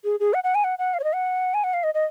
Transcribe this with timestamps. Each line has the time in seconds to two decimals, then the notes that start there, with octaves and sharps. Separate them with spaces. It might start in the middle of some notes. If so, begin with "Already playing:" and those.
0.04 G#4
0.20 G#4
0.34 F#5
0.44 F#5
0.55 G#5
0.64 F#5
0.79 F#5
0.94 F5
1.00 C#5
1.04 D#5
1.14 F#5
1.54 G#5
1.64 F#5
1.74 F5
1.84 D#5
1.94 D#5